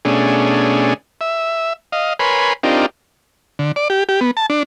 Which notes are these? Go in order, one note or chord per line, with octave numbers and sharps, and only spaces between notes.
B2 A3 C#4 D4 G#4
E5
D#5 F5
A#4 B4 C#5 G#5 B5 C6
C4 D4 D#4 F4 G4 A#4
D3
D5
G4
G4
B3
A5
D4